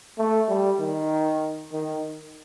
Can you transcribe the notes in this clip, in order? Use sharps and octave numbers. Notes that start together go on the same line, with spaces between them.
A3
G3
D#3
D#3